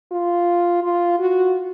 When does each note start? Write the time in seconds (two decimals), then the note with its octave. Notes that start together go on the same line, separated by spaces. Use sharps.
0.11 F4
0.83 F4
1.19 F#4